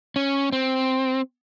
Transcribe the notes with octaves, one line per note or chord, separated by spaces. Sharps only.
C#4
C4